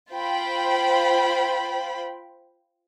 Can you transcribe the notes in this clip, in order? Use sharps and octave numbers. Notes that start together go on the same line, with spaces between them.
F4 C5 G5 B5